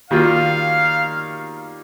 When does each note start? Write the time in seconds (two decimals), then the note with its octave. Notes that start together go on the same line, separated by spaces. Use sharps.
0.11 D#3 G3 A#3 F4 F5